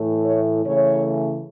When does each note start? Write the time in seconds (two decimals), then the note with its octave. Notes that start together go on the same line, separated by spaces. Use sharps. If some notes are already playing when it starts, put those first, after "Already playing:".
Already playing: A2 E3 A3
0.26 C#5
0.65 C#3 E3 A3 C#5